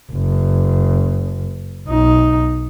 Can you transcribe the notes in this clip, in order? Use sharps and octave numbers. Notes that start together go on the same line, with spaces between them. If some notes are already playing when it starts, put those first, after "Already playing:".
F#1
B1 D#4